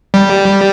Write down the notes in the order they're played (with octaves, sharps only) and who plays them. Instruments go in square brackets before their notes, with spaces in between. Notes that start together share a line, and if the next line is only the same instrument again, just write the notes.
[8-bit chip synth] G3